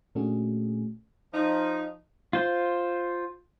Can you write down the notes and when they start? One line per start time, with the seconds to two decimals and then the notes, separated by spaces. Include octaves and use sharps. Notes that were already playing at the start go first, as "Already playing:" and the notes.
0.15 A#2 A3 C#4 D4 F#4 G#4
1.32 F3 D#4
2.33 F4 C5